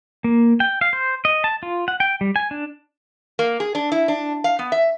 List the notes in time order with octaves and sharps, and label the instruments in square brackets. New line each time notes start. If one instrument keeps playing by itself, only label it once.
[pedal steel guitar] A#3
G5
F5
C5
D#5
A5
F4
F#5
G5
G3
G#5
D4
[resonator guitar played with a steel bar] A#3
G#4
D4
E4
D4
F5
B3
E5